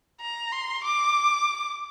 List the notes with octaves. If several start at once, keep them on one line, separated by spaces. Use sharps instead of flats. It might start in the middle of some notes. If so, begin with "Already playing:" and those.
A#5
C6
D6